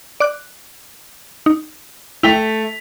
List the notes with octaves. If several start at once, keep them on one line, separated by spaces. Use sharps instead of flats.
D5 D6 F#6
D#4
A3 E4 G5 B6 F7